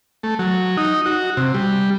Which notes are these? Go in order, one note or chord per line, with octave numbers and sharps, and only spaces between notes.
A3
F#3
D#4
F#4
C3
G3